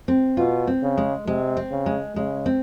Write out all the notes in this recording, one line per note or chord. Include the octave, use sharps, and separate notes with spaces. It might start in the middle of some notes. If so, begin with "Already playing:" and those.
C4
B2 F4
C4
C#3
G#3
C3 G#3
C4
C#3
G#3
C#3 G#3
C4